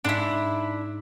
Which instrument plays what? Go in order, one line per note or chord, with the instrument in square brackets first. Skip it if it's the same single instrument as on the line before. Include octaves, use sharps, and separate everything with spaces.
[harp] G#2 C6 [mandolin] D4 E4